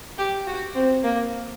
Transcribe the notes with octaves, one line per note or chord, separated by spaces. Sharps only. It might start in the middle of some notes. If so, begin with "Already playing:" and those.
G4
F#4
C4
A#3